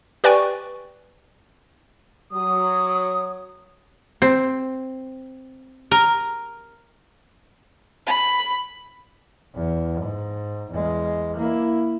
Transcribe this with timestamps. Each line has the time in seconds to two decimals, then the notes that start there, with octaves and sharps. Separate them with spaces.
0.24 G4 B4 D5 G5 G#5 C#6
2.32 F#3 D#6
4.22 C4
5.91 A#4
8.06 B5
9.55 E2
10.01 G#2
10.71 E2 G#3
11.37 A#3 E4